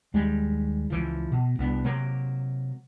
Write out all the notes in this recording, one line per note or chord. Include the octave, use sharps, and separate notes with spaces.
D#2 G3 G#3
C#2 E3 F3
B2
C2 B3 D4
C3 F#3 A#3